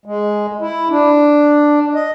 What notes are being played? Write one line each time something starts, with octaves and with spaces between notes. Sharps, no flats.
G#3
E4
D4
D#5